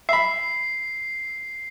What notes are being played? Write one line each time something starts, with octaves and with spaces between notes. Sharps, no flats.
E5 B5 C7